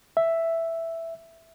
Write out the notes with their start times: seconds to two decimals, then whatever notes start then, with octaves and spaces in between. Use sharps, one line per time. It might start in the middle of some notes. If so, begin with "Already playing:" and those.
0.17 E5